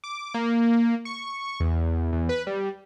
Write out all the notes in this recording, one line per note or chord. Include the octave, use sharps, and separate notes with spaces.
D6
A#3
C#6
E2
E2
B4
G3